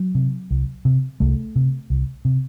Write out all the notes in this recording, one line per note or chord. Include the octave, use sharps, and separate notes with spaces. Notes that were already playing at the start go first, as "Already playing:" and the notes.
Already playing: F#3
C3
C2
C3
C2 A3
C3
C2
C3